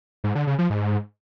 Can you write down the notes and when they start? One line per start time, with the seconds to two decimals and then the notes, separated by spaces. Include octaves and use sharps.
0.24 G#2
0.35 D3
0.47 C#3
0.59 F3
0.70 G#2